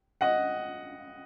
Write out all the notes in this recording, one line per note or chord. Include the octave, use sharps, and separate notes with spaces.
D#5 F#5